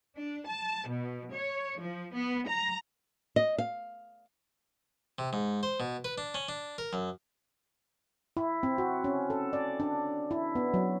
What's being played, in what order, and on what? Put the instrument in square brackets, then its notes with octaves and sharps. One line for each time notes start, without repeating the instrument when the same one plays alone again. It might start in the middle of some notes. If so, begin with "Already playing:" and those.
[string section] D4
A5
B2
C#5
F3
B3
A#5
[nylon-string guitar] D#5
F5
[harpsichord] C3
G#2
C5
B2
B4
D4
C#4
D4
A#4
F#2
[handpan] E4
C4
F#4
C#4
A4
D5
D4
E4
B3
F#3